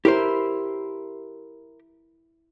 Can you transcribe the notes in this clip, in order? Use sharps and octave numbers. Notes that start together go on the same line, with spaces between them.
E4 G4 A#4 C5